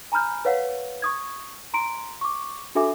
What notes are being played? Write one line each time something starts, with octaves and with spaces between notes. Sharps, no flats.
G#5 A#5 B5 F6 G6
B4 C#5 F5 F#5
C#6 D#6 G#6
A#5 C6 D7
C#6 D6
D4 F#4 A4 E5 G#5 D6